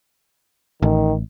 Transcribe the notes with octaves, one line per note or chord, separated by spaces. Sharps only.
A1 D#3